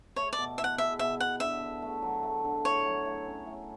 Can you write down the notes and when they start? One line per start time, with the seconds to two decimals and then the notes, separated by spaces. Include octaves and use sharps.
0.16 A3 C#5
0.33 D5
0.38 B2
0.58 E4 E5
0.64 F#5
0.78 G#4 E5
0.99 B2 E5
1.19 B2 F#5
1.40 D3 E5
1.62 D3
1.82 A3
2.02 F#3
2.23 A3
2.44 D3
2.65 A2 C#5
2.86 F#3
3.05 A2
3.26 C#4
3.46 A2